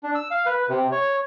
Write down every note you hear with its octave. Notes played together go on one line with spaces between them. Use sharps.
D4
E6
F5
B4
C3
C#5